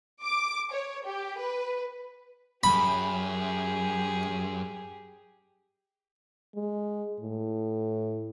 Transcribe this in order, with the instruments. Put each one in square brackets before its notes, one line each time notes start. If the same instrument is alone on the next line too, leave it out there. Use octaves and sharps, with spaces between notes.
[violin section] D6
C#5
G4
B4
[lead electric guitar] F#2 [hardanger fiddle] G4 G#4 [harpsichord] B5
[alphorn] G#3
A2